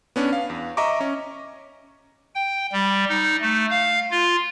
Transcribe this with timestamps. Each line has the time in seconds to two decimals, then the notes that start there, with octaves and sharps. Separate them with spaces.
0.16 B3 C#4 D4
0.33 F5
0.50 E2
0.77 D#5 E5 A#5 C#6 D6
1.00 C#4
2.35 G5
2.72 G3
3.09 D#4
3.41 A3
3.70 F5
4.11 F4